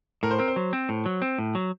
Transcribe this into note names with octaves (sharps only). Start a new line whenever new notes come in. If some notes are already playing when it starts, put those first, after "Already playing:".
A2 A#4
C5
C4 A#4
C5
F#3
C4
A2
F#3
C4
A2
F#3